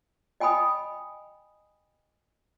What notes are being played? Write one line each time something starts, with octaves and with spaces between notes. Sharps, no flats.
D#5 G5 G#5 B5 D#6